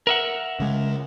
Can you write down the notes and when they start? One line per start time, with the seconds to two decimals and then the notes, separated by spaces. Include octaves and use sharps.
0.07 A#4 E5 F#5
0.60 C#3 G#3